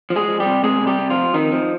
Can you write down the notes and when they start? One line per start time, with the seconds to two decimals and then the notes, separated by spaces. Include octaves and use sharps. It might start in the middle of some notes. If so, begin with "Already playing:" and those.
0.10 F3
0.16 G#3 G#4
0.28 F3
0.40 G3 G4
0.45 C3
0.63 C3 G#3 G#4
0.81 C3
0.87 G3 G4
0.99 C3
1.10 F3 F4
1.16 F2
1.34 F2 D#3 D#4
1.52 F3